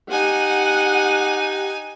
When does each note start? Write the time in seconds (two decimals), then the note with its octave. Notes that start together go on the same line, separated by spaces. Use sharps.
0.11 D#4 G4 F#5 G#5